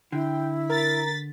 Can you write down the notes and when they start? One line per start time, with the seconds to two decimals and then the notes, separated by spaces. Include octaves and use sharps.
0.12 D3 E4 G5
0.69 A#4 A6 B6